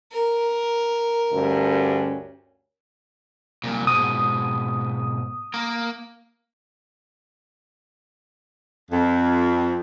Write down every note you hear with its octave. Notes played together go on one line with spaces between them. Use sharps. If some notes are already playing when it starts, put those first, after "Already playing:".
A#4
D2 G2 C#4
C2 A#2
G#2 B2 D#6
A#3 A#4
F2